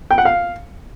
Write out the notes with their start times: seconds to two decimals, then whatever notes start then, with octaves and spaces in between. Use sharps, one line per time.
0.11 G5
0.18 F#5
0.25 F5